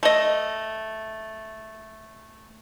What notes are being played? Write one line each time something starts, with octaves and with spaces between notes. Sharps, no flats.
A3 D#5